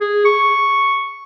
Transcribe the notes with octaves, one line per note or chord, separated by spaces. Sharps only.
G#4
C#6